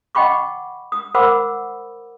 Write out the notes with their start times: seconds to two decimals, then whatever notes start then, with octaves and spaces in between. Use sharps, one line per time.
0.15 D#5 F#5 G5 B5 C#6 D6
0.92 D#6
1.14 A#4 C5 F#5 B5 D6 E6